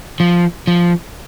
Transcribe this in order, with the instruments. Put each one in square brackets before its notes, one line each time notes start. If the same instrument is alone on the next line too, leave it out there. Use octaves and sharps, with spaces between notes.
[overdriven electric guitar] F3
F3